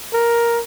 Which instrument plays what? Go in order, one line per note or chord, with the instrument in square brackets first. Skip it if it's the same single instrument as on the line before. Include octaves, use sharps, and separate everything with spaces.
[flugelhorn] A#4